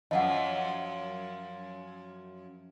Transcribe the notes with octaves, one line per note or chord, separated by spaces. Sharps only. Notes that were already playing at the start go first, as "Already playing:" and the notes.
F#2 F3 D#5 F#5